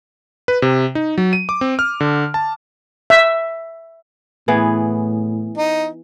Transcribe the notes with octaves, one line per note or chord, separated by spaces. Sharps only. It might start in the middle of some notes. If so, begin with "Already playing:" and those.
B4
C3
D#4
F#3
D#7
D6
C4
F6
D3
A5
E5
A2 E3 B3 G#4
D#4